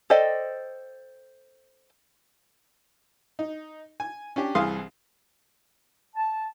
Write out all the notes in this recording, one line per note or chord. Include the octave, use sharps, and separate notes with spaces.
A4 C5 D5 D#5 G5
D#4
G#5
C#4 D4 G4
C2 E3 G#4 F5 C6 D#6
A5